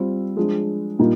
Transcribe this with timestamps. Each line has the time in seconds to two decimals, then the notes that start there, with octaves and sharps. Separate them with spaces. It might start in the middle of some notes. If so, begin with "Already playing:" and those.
Already playing: G3 C4 F4
0.36 F3 G#3 D4
0.99 A#2 G3 A#3 D#4